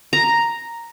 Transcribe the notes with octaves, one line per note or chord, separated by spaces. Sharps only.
A#5